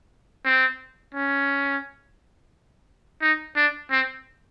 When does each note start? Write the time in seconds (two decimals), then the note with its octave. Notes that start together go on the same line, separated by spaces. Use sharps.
0.45 C4
1.14 C#4
3.22 D#4
3.56 D4
3.91 C4